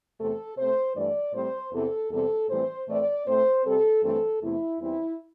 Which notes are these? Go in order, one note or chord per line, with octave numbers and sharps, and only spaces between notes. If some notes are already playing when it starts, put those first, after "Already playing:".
E2 C3 A3 C4 A4
C3 A3 C4 C5
G2 E3 A3 D5
A2 G3 C4 C5
E2 C3 E3 C4 A4
E2 C3 G3 C4 A4
A2 E3 G3 C4 C5
A2 E3 A3 C4 D5
A2 A3 C4 C5
C3 G3 C4 A4
G2 E3 A3 C4 A4
E2 C3 A3 E4
E2 E3 G3 C4 E4